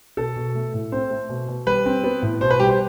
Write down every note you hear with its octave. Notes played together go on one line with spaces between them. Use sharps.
B2 A4
B2
A3
A2
C4 C5
A3
B2
B2
G3 B4
C4
B3
A2
B2 C5
B4
G3 G4
C5